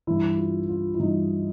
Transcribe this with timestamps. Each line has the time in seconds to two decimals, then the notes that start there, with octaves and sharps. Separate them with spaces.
0.07 G2 E3 E4
0.38 F4
0.69 F4
0.94 E4
0.99 G2 E3 D#4